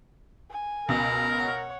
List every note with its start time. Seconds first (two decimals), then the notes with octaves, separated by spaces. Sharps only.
0.51 G#5
0.89 C#2 B2 A#4
1.39 C#5 F#5